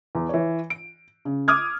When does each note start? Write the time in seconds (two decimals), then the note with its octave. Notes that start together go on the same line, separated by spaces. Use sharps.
0.15 E2
0.29 E3 C#5
0.70 D7
1.25 C#3
1.48 D6 D#6 F6 G#6